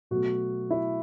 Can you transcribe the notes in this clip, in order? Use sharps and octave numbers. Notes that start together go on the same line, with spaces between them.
B2 F#3 A3 F#4
E4